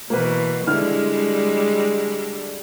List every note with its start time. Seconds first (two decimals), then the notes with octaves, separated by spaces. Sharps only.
0.10 B2 E3 A#3 B4
0.67 D3 G3 G#3 D4 E4 F6